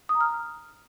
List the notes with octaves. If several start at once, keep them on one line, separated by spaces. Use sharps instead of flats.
D#6
A#5
F6